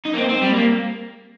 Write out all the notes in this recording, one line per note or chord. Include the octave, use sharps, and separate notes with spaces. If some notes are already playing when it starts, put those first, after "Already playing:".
D#4
A#3
C4
C4
G3
A#3